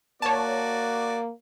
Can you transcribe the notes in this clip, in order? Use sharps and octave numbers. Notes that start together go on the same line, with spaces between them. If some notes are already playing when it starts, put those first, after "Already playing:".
A#3 F#4 C#5 D5 A5